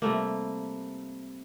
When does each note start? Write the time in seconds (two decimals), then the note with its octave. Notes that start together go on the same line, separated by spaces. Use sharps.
0.02 C3 G3 A3 A#3